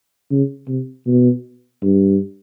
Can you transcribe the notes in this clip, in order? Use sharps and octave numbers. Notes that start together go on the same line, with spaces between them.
C#3
C3
B2
G2